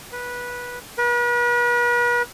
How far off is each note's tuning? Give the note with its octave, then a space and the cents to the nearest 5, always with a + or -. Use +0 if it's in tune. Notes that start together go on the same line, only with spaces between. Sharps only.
B4 -15
B4 -40